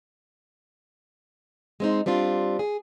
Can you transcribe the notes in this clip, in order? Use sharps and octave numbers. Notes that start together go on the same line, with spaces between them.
G#3 C4 D#4
G3 C4 D4 F4
G#4